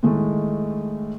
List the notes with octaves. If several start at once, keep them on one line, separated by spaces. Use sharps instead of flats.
A2 D#3 G#3 A3